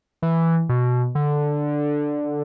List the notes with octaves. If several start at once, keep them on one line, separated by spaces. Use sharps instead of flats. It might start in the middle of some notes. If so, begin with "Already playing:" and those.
E3
B2
D3